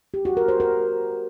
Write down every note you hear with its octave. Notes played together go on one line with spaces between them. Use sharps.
G4
F#4
A#4
C5
A#4